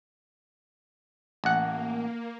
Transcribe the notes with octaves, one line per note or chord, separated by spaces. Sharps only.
A1 A#3 F#5